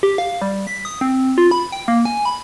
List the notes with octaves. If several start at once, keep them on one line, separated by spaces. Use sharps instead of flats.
G4
F5
G3
B6
D#6
C4
F4
B5
G5
A#3
G#5
B5